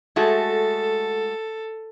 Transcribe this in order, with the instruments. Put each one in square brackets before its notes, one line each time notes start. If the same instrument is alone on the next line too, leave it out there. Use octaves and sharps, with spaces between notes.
[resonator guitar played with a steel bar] G#3 A3 F#4 [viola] A4